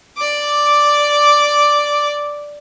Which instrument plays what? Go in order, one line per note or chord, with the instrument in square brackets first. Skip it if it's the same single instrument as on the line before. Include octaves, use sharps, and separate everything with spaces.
[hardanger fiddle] D5 D6